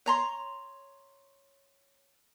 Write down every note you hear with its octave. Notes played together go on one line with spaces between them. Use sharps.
C#5 A#5 C6